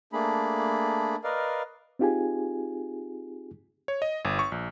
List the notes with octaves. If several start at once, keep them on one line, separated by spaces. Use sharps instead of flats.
A3 A#3 D4 G#4 B5
A#4 B4 D5 D#5 F5
C4 D#4 F4 G4 G#4 G#5
C#5
D#5
G1
C#6
A#1